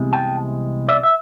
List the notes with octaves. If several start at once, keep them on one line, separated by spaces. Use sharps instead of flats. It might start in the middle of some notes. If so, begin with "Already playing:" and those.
Already playing: C2 C3 E3 G#3 B3
G5 A5
D5 E5
E5